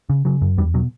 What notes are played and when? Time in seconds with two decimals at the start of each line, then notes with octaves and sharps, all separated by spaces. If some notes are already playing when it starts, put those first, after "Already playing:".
0.10 C#3
0.25 C#3 F#3
0.42 F#2
0.57 E2 G3
0.74 B2 F#3